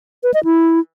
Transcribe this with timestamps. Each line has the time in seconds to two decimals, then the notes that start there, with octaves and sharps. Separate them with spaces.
0.23 B4
0.34 D#5
0.44 E4